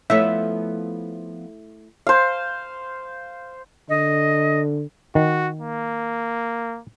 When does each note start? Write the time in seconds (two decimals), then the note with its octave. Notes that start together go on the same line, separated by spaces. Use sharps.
0.10 F3 A3 B3 E4 C#5 E5
2.07 C5 F5
3.89 D3 D#5
5.15 D#3 F#4
5.60 A#3